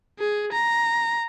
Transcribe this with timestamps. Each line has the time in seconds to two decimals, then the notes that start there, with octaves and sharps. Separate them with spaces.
0.19 G#4
0.53 A#5